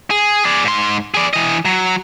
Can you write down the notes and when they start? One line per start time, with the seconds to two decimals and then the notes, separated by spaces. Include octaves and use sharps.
0.11 G#4
0.44 G#4 D5
0.64 G#2 C6
1.14 G#4 D5
1.33 E3 D#5
1.65 F#3